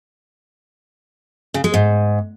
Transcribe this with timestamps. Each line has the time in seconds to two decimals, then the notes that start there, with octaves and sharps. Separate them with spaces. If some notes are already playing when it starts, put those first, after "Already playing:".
1.54 C#3
1.64 G#3
1.74 G#2